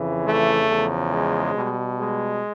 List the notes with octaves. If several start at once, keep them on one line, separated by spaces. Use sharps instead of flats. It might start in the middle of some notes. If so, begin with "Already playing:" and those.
Already playing: F2 C#3 E3
A3
E2 C#3 F3
G#3
B2 G3
G#3